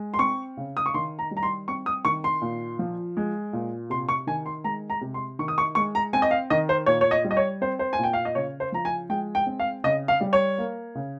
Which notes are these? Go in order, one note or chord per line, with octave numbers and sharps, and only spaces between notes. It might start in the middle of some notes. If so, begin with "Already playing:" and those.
Already playing: G#3
C6
C4 C#6
C#3
D#6
C#6
D#3 C6
A#5
G3
A#5
C6
C4 C#6
D#6
D#3 C#6
C6
A#2
F3
G#3
A#2
C3 C6
C#6
D#3 G#5
C6
G#3 A#5
A#5
C3
C6
D#3 C#6
D#6
C#6
G#3 C#6
A#5
C4 G#5
D#5
F5
D#3 D#5
C5
A#2 C#5
C#5
D#5
G3
D#5
C#5
C4 C5
C5
G#5
A#2 G5
F5
D#5
C#3 C#5
C5
F3 A#5
G#5
G#3 G5
G5
C4
F5
C#3 D#5
F5
G3
C#5
A#3
C#3